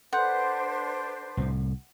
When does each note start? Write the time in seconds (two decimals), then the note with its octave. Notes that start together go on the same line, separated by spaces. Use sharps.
0.13 D4 A4 B4 C5 F#5 C6 G6
1.37 C2 A2